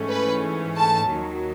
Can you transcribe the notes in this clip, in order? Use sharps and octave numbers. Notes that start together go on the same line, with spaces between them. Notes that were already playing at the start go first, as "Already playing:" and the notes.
Already playing: G#2 E3 A3 C#4
B4
A5
D#2 D#3 F#3